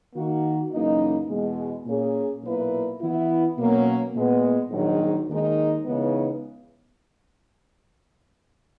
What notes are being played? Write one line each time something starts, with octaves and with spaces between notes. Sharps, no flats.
D#3 A#3 D#4 F#4
F#1 F#2 E3 A#3 D#4
E2 B2 G#3
A#2 A#3 C#4 G#4 C#5
B1 A#2 A#3 E4 B4
E3 B3 E4
B2 F#3 A#3 C#4
A#2 G#3 B3
A#1 G#2 D#3 F#3
D#2 D#3 G#3 D#4 A#4
C#2 C#3 E3 B3 D#4